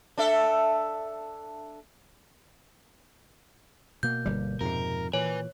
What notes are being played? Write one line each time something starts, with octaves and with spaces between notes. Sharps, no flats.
D4 A4 E5
B2 A#3 G6
G1 G3
F2 G#2 C3 A#4
A#2 E3 B4 C#5 G#5